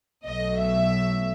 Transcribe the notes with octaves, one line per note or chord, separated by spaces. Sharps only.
B1 B2 F#3 A3 D#5
E5